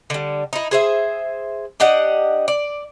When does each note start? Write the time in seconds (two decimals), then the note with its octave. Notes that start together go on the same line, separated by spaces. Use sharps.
0.10 D3 G3
0.53 D#4 E4
0.71 G#4 C5 E5
1.80 D4 G4 D#5 F#5
2.48 D5